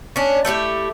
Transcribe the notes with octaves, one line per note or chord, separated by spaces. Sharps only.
C#4 D4
A3 E4 F4 G4